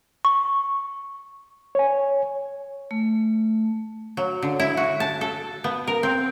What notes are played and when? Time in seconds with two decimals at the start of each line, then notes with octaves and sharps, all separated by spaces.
0.25 C#6
1.75 C#5 G#5
2.91 A3
4.17 F#3
4.42 D3
4.60 E4
4.77 F#4
5.00 A5
5.21 A4
5.64 B3
5.87 A#4
6.03 C4